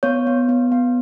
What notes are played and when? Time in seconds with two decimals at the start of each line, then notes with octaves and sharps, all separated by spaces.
0.03 B3 C#5
0.27 B3
0.49 B3
0.72 B3